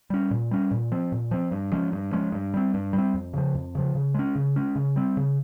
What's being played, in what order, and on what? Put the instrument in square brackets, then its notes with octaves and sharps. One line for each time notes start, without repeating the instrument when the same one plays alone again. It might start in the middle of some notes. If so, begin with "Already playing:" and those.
[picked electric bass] G3 C#4
A#2
G3 C#4
A#2
F3 C4
A#2
F3 C4
G2
F3 G#3 C#4
G2
F3 G#3 C#4
G2
G3 C4
G2
G3
C4
F2
C#3 F3
F2
C#3 F3
C#3
G#3 C#4
C#3
G#3 C#4
C#3
G3 C4
C#3